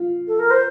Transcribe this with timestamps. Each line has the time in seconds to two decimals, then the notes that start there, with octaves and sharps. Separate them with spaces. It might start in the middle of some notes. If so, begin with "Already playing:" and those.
Already playing: F4
0.28 A4
0.39 A#4
0.51 C5